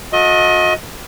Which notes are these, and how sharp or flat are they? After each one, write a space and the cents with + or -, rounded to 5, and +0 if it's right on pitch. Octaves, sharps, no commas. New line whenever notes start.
F#4 -40 A4 +0 D#5 +20